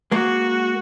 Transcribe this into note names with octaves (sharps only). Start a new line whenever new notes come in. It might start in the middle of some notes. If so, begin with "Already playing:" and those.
G#3 A#3 F#4